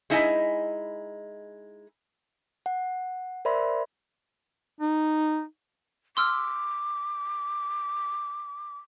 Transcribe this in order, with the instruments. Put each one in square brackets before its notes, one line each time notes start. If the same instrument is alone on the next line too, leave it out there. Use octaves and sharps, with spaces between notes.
[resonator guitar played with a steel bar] G#3 D#4 E4 D#5 G#5
[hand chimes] F#5
A#4 C5 D5 E5 B5 C6
[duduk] D#4
[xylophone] C6 E6 F6 [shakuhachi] D6